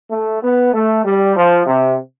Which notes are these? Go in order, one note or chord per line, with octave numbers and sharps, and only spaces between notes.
A3
B3
A3
G3
F3
C3